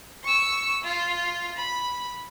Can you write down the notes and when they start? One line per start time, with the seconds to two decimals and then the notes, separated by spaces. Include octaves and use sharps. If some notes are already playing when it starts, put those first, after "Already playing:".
0.24 C#6 E6
0.83 F4
1.56 B5